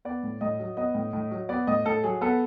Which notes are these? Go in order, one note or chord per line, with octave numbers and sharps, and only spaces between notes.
B3 D5
A2
A2 D#5
F#3
B3 D#5
A2
A2
F#3
B3 D5
A2 D#5
A2 A4
F#3 G#4
B3 A4